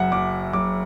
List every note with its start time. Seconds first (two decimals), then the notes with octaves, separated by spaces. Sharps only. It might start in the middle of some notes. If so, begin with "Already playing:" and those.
Already playing: F#1 F#2 E5 F#5
0.12 F#1 D6
0.53 F#1 D6